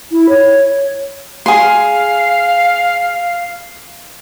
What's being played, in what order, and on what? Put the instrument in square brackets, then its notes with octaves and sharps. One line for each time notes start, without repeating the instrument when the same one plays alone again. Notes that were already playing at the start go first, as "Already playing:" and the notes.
[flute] E4
C#5
[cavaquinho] G#4 C6 [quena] F5